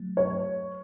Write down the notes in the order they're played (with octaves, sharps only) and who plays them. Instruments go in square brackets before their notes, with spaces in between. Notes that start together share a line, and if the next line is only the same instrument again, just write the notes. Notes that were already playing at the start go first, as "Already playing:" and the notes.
Already playing: [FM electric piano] F#3 A3
[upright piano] C#5